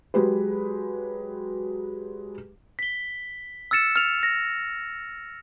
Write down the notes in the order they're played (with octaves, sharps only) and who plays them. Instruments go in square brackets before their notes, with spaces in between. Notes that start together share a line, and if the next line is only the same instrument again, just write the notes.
[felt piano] F#3 G#3 G4 G#4 B4
[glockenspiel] B6 G7
E6 F6 A6 C#7 E7
F6 F7
A#6